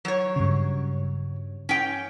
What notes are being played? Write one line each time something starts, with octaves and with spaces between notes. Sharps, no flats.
F#3 C#5
G2 C#3
C#4 G5